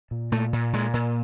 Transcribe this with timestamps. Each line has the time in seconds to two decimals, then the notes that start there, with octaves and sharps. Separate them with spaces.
0.11 A#2
0.32 A#2 A3
0.53 A#2
0.73 A#2 G#3
0.94 A#2